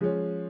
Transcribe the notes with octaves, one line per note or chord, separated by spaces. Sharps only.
F3 G#3 C#4